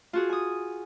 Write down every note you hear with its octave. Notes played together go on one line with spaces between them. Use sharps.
F4 F#4 G#4
G#5 D#6